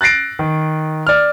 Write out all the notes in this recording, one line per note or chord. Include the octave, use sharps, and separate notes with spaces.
F#6 A6 A#6 C7 D7
D#3
D5 F6